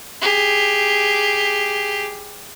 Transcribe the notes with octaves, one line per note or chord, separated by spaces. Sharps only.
G4 G#4